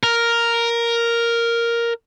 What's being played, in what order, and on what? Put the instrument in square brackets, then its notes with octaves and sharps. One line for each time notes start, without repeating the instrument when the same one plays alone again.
[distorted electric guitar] A#4